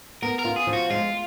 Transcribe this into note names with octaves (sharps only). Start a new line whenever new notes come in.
B3 A#4
A#4
F4
G#4
F3
F#4
G#3 F4